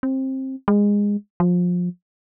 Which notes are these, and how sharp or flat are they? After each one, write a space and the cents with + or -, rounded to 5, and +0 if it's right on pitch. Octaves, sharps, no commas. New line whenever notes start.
C4 +20
G#3 -20
F3 +25